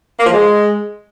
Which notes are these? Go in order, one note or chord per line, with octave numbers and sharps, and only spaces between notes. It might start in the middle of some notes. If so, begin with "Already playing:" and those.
A#3
F3
G#3